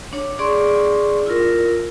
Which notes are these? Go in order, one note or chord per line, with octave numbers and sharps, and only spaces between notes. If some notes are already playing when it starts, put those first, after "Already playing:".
D4 C#5
D4 G#4 D5 C6 C#6
E4 F4 A#4